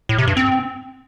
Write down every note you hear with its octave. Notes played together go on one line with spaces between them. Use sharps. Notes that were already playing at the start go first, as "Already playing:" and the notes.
A2
C3
G2
C4